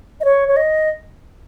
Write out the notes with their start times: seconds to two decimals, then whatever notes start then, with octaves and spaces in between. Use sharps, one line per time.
0.20 D#5
0.25 C#5
0.48 C#5
0.56 D#5